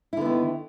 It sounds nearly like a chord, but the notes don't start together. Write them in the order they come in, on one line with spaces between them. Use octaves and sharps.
E4 D3 B3 D#3